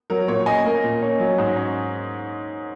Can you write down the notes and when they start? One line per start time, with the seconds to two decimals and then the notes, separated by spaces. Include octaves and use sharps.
0.10 F#3 A#4
0.28 A#2 C#5
0.46 C#4 D#5 G#5
0.65 A#3
0.84 A#2
1.02 C#4
1.20 F#3
1.38 G#2
1.56 C#4